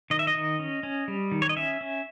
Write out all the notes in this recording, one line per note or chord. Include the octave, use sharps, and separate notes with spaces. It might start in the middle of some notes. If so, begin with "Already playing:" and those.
D#3 D#5
E5
D#5
D#3
C#4
C#4
G3
D#3
C#5
D#5
C#4 E5
C#4